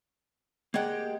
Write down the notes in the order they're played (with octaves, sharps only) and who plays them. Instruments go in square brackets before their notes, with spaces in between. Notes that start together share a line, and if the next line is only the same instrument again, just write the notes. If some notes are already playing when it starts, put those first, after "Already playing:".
[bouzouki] G#3 G4 [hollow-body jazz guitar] A#3 D5 F#5